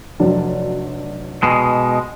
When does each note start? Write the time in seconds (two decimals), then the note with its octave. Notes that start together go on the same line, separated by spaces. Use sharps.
0.20 F1 F#3 D4
1.43 B2 G#3